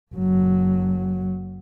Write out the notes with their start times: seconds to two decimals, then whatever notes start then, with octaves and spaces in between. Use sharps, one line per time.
0.14 F#1 F#3